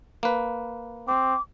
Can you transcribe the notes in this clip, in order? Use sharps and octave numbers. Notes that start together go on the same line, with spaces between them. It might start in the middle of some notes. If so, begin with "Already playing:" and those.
A#3 B4
C4 D6